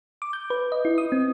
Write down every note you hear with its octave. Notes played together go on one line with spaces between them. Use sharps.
D6
G6
B4
D#5
E4
D#6
C4